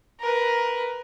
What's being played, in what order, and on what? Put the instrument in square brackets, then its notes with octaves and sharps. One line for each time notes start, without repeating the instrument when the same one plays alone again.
[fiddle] A#4 B4